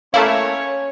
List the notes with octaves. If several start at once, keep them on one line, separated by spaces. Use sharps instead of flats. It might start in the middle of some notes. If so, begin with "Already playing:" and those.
A3 A#3 C#4 E4 C#5 F5